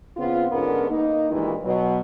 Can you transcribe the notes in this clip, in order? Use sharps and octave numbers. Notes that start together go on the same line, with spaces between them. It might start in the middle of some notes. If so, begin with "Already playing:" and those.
C#3 B3 C4 F4
G#2 D3 B3 C#4 A#4
A#3 D#4
G2 A#2 D#3 E3 G#3 E4
B2 F#3